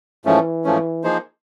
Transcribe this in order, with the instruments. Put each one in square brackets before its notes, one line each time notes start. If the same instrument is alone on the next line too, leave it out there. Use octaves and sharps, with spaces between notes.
[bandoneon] G#2 F3 A3 C#4 [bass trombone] E3
[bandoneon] G#2 F3 A3 C#4
F3 A#3 D#4 G#4 C5